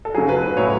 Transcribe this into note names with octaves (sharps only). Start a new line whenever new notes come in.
A4
C#3 F#3 G#4
B4
B4
A2 F#3 C#5